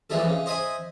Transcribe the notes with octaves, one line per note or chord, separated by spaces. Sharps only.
A#2 E3 F3 G#3 E4 A4
C#3
C5 D#5 E5 G#5 B5